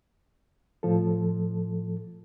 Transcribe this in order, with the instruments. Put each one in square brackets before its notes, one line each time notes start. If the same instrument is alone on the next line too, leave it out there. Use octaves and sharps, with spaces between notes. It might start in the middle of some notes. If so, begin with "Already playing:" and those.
[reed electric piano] A2 F3 A4